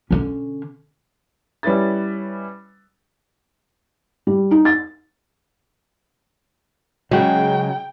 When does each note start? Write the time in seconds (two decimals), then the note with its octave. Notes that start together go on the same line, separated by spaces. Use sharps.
0.11 D3 C#4
1.63 G3 C#4 E4 B4 A6
4.27 G3
4.51 D#4
4.65 A6
7.11 C#3 F#3 G#3 F#4 G5